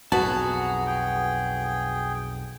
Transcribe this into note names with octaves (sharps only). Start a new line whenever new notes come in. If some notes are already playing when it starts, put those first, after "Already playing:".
B1 F2 F#4 G#4 B4 A5 A#5
G#4 G5